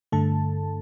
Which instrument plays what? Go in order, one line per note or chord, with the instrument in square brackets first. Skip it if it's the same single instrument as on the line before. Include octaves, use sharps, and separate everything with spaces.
[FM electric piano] G2 D3 A3 A4 A5